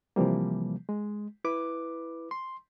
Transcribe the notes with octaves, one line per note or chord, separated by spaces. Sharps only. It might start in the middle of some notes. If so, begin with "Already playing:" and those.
C3 E3 F3 G3 A#3
G#3
E4 B4 D6
C6